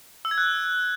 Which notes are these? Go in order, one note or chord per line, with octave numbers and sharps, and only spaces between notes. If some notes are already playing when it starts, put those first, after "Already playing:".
E6
G#6
F#6